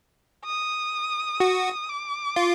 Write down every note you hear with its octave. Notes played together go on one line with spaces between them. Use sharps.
D#6
F#4
D6
F4